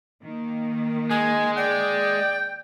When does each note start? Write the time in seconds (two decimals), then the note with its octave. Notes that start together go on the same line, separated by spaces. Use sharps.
0.23 D#3 A#3
1.10 G#3 G#5
1.57 D5 G5